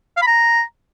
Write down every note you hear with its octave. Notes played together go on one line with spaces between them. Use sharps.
F5
B5
A#5